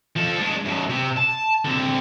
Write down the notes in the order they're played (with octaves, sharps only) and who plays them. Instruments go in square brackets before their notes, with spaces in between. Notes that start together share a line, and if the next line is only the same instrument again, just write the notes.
[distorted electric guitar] F3 A4
G#3 D4
F#2 B2
C3
A5
D3 C4